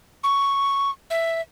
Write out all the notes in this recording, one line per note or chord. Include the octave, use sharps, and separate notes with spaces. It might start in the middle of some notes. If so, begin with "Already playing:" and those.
C#6
E5